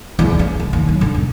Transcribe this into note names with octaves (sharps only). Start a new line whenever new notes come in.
E2
C#4
D#3
D#2
F#3
D3
E1